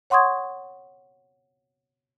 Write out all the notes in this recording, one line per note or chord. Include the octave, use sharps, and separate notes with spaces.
C#5 F#5 C6 C#6 D#6 G#6